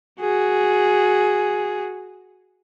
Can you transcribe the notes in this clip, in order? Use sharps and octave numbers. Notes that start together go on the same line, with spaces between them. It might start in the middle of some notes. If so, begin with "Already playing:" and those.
F#4 G#4